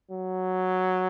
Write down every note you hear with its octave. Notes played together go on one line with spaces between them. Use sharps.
F#3